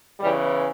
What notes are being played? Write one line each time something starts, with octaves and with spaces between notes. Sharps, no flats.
E2 C#3 E3 G3